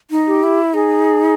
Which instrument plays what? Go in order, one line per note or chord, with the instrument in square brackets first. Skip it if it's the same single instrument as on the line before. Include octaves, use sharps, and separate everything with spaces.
[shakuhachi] D#4
[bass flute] G4
[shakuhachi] E4
[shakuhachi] D#4 [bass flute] G#4